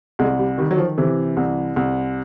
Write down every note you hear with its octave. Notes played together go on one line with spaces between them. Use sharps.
C2 G#3
G3
D#3 G3
F#3
F3
C3 E3
C2
C2